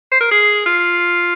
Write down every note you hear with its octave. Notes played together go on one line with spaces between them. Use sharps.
C5
A#4
G#4
F4